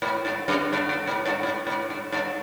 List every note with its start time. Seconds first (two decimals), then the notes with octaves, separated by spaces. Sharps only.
0.02 G#2
0.25 G2
0.48 F#2
0.73 G2
0.89 G2
1.08 G#2
1.26 G2
1.43 G#2
1.67 G#2
1.90 G2
2.12 G2